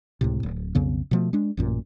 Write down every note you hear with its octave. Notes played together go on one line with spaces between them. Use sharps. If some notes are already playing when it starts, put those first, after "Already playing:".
C#2 A2 C3
D1
B1 F2 C#3 B3
B2 F3 A3
G#3 D4
A1 F#2 A#2